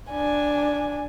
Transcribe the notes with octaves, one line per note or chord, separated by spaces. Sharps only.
D4 G#5